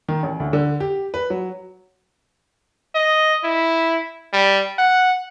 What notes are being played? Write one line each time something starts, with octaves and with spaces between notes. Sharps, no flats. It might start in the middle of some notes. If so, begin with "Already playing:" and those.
D#3
A1
D2
D3
G4
B4
F#3
D#5
E4
G3
F#5